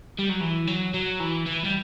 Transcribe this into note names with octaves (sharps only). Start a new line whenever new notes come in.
G3
F#3
E3
F#3
F#3
E3
E3
G3